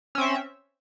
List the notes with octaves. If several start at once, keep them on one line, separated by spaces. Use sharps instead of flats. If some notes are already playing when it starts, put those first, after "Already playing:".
C4 C#4 E5